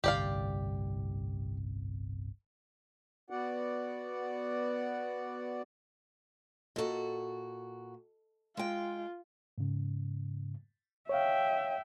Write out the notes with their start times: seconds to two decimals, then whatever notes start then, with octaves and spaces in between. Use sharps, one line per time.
0.04 G1 C2 A2 G4 D5 F5
3.30 B3 F#4 D5 F#5
6.76 A#2 F#4 A4 D#5
8.57 G#3 F4 G5
9.58 G#2 C#3
11.09 C#5 E5 F5 G5